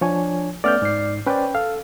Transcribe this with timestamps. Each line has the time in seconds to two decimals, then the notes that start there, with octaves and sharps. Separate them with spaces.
0.01 F3 D4 C#5 G#5
0.64 A3 B3 C#4 D5 F6 G6
0.82 G#2 C7
1.26 C#4 B4 C5 D5 G5
1.55 A4 F5